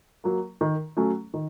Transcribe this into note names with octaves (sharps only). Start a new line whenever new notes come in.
F#3 A#3
D#3
F#3 A3 C#4
D#3